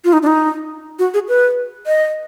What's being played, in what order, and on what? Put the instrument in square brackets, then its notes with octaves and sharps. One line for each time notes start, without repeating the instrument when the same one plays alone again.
[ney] F4
D#4
D4
D#4
F#4
G#4
B4
D#5